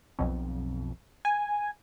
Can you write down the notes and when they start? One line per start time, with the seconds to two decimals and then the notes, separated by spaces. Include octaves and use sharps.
0.19 B1 F2
1.25 G#5